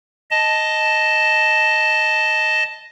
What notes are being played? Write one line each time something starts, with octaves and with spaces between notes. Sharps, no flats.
D#5 A5